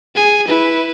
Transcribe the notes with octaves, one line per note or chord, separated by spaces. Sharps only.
G#4 G#5
E4 B4